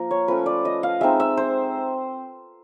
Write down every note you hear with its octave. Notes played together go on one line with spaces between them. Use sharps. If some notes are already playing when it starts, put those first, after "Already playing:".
Already playing: F3 A#3 A#4
C#5
F3 A3 C#4 B4
D5
D#5
F5
G#3 C4 D#4 E5
E5
C5